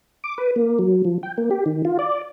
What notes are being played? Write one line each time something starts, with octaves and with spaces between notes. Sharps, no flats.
D6
B4
A#3
F#3
F3
G5
A#3
G4
D#3
F4
D5